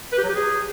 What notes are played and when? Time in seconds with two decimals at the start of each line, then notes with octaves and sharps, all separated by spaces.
0.12 B4
0.18 G4
0.23 F#3
0.29 G4
0.35 G#4